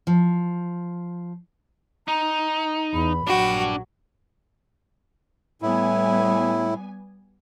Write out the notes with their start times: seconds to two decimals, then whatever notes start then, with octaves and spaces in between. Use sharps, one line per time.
0.07 F3
2.08 D#4 A#5
2.94 E2 B5
3.27 A#1 F#3 D4 F#4 G5
5.62 A2 G3 B3 E4 G#5